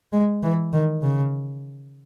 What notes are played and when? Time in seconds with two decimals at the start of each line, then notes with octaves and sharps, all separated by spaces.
0.13 G#3
0.43 E3
0.73 D#3
1.02 C#3